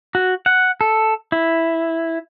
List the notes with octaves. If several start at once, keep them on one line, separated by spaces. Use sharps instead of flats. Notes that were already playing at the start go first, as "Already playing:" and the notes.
F#4
F#5
A4
E4